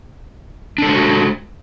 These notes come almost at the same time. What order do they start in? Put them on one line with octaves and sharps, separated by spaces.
D4 A4 G#3 F#4